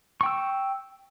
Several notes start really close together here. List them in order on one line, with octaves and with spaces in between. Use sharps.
C#6 G5 E6